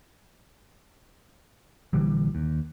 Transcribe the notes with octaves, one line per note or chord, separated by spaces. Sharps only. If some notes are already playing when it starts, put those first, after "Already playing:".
A#1 D3 E3 G3
D#2